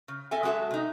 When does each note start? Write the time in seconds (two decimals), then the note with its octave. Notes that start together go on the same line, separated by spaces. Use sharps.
0.08 C#3
0.31 C4 A4 E5 G#5
0.43 G#3 F#4 G4 A4 E5
0.71 C3 D#4